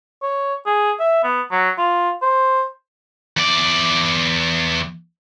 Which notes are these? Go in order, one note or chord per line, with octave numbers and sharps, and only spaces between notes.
C#5
G#4
E5
B3
F#3
F4
C5
E2 D5